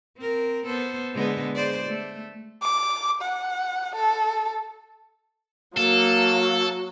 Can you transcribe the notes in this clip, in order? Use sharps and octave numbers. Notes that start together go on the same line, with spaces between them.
C4 A#4
B3 A4 C5
D3 G#3 B3
G#4 C5 D5
A3
D6
F#5
A4
F#3 A#3 A4